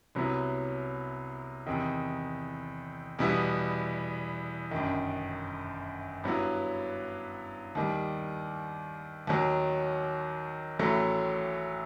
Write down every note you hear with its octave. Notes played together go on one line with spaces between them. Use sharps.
C2 C3 F#3 B3 E4
E2 C3 D#3
E2 B2 G3 B3 E4
G1 F#2 D#3
G2 F#3 B3 E4
D#2 D#3 G3
D#2 D#3 F#3
A1 A2 F#3 A3